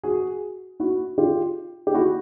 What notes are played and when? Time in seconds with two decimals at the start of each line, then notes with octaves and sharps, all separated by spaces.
0.03 F#4 G#4
0.80 E4 F#4
1.18 F4 G4
1.87 G4
1.94 E4 F#4